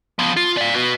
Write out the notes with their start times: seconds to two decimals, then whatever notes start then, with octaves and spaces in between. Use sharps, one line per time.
0.19 F3 B3
0.37 F4
0.57 D5 F5
0.74 F#4 B4